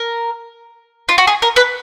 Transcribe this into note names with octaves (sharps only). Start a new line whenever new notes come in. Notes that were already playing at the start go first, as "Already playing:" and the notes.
Already playing: A#4
F4
F#4
G#4
A#4
B4